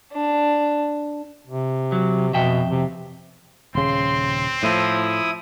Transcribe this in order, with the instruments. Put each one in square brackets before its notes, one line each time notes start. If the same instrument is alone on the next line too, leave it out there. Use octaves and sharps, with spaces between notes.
[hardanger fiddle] D4
[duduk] C3
[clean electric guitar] F#3
[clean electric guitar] F2 E5 G5 [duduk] B2
[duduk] C3
[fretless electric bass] D#1 C#3 [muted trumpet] C4 [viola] C6
[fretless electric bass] A2 [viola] F3 [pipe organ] E4 D#6